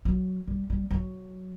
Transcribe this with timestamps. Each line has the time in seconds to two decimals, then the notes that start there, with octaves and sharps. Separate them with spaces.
0.05 F#3
0.47 G3
0.70 G3
0.91 F#3